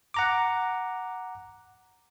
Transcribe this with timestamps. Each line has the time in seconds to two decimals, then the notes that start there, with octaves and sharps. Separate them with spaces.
0.14 F#5 A#5 D6